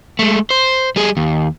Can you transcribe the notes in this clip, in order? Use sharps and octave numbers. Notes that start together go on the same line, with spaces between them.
G#3 A3
C5
G3 G#4
D#2